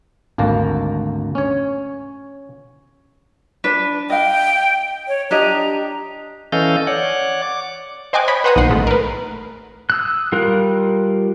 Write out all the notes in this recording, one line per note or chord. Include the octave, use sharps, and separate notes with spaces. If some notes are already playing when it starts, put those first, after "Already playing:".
G#1 D2 A#3 A5 A#5
C#4 C#5
D4 B4
D#5 F5 G5
C#5
D4 G4 D#5 A#5
E3 C#4 A4 D#5 F5 G6
C#5 D5 F#5
D6
C5 D#5 G5 G#5 D6 F#6
C#5 D#5 B5 C#6
B4 C5 F#5 A#5 D#6 F#6
B1 A#2 D#3 F#5 C7
A1 G#3 A3
A#4 B4
D#6 E6 F#6
G3 F4 A#4 F#6